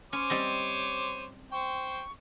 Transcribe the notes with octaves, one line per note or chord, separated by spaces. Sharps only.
C#4 C5 C#5 D6 D#7
G3 C4 D#5
C5 G5 C#6